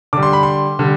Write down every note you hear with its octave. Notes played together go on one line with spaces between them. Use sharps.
D3 G3 D6
C6
B5
C6
D3 G3